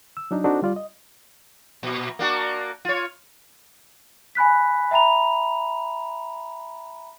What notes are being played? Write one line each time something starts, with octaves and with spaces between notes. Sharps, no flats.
E6
F#3 D4 D#4
C4 D4 D#4 F#4 A4 C5
G3 F4 D5
D#5
A#2
A#3 D4 F#4
F4 C#5
G#5 B5 F#6 B6
E5 G5 A#5 B5 F7